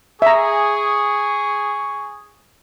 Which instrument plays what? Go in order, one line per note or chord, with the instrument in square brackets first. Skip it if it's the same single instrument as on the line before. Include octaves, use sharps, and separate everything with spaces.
[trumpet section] G#4 [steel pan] E5 A#5 [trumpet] C#6